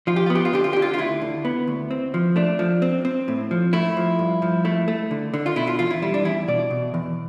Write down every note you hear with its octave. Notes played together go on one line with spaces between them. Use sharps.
F3 F4
G4
B3 F4
G4
F4
D3 G4
F4
D3 G4
F4
F4
D2 E4
D3
B3
D2
C4
F3
A3 D4
F3
C4
C4
A2
F3
A3 E4
F3
G2
F3
A3 E4
A3
D3
D3
F4
B2 E4
F4
E2 F4
E4
G3 E4
D4
E2 E4
B2 D5
B2
E2